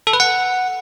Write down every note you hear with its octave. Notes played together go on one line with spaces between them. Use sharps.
A4
B4
F#5